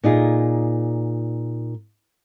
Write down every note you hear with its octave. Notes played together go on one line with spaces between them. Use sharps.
A#2 D#4 F4 G#4